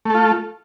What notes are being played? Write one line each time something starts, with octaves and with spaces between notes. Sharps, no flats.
A3 F4 A4